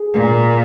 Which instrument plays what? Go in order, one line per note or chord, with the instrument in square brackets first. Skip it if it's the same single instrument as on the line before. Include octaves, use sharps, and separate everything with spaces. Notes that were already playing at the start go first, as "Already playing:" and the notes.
Already playing: [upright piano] G#4
[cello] A#2